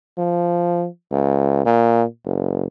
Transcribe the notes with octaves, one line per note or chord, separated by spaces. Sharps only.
F3
C#2
A#2
F#1